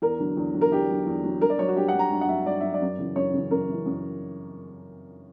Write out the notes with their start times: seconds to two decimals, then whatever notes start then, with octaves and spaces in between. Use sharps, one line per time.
0.02 E2 A#4
0.20 D3 F#3
0.37 E2
0.54 D3 F#3
0.61 A#4
0.72 E2 G4
0.89 D3 F#3
1.07 E2
1.24 D3 F#3
1.41 G2 A#4
1.50 D5
1.59 F#3 C#5
1.68 F#4
1.76 G2 G4
1.88 F#5
1.94 F#3
1.99 A#5
2.12 G2
2.21 F#5
2.29 F#3 E5
2.46 G2 D5
2.60 F#3 E5
2.74 D5
2.81 F#2
2.99 C#3 E3
3.16 F#2 C#5
3.33 C#3 E3
3.51 F#2 A#4
3.69 C#3 E3
3.86 F#2